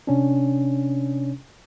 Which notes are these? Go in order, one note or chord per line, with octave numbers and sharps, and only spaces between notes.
C3 C#4 D4